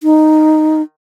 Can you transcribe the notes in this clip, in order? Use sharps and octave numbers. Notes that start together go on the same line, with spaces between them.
D#4